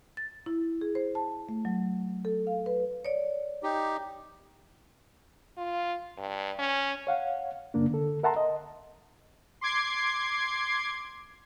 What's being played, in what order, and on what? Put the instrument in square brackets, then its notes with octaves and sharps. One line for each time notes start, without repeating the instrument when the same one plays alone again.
[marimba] A6
E4
G#4
C5
A5
A3
F#3
A4
F5
B4
C#5 D5
[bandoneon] D#4 G4
[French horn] F4
G2
C#4
[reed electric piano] C#5 F5 F#5
F#2 C#3 A#3 D4
D3 A4
A#4 E5 F#5 A5 A#5 C6
D#5
[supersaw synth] C6 D6 G#6 C7